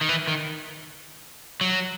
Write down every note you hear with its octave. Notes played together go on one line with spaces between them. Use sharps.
D#3
E3
D#3
F#3